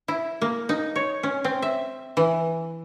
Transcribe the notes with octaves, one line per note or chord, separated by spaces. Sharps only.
E4
A#3
D#4
C#5
C#4
C4
E5
E3